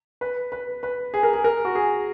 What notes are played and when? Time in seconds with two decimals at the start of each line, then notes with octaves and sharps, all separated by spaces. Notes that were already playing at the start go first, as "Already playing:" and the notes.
0.21 B4
0.52 B4
0.83 B4
1.14 G#4
1.23 A#4
1.33 G#4
1.44 A#4
1.65 F#4
1.75 G#4